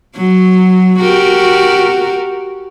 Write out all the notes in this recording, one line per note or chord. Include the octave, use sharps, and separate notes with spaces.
F#3
F#4 G4 A#4